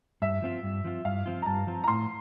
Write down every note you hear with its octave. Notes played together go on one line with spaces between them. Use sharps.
G2 E5
F3 C4 F4
G2
F3 C4 F4
G2 F5
F3 C4 F4
A#5
G2 A5
F3 C4 F4
A#5
A2 C6